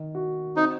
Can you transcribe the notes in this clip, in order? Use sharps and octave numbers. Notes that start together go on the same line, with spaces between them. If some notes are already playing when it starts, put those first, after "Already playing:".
Already playing: D#3
F#4
C4 D#4